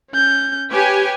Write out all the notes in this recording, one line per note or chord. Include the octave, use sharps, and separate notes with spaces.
C#4 G6
G4 B4 C#5 G#5